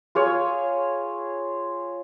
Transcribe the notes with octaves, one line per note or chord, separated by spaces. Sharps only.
F4 G#4 C#5